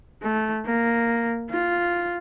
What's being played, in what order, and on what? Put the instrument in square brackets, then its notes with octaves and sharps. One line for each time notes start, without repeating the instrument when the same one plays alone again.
[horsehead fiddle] A3
A#3
F4